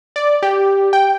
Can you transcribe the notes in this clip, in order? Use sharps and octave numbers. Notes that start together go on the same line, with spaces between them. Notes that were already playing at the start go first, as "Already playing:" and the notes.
D5
G4
G5